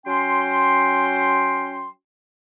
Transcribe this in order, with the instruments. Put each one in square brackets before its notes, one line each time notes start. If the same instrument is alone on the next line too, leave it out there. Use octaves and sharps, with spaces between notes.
[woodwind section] F#3 C#4 G5 C6